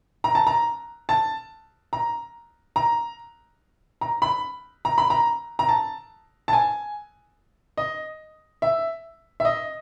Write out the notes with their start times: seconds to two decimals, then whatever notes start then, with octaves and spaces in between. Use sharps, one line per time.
0.24 A#5
0.35 A5
0.47 A#5
1.09 A5
1.93 A#5
2.76 A#5
4.01 A#5
4.22 B5
4.85 A#5
4.98 B5
5.10 A#5
5.59 A#5
5.69 A5
6.48 A5
6.53 G#5
7.77 D#5
8.62 E5
9.40 E5
9.45 D#5